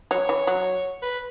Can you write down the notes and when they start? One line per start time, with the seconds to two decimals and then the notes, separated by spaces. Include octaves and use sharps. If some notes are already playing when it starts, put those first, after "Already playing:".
0.11 F#3 C#5
0.29 E3
0.47 F#3
1.02 B4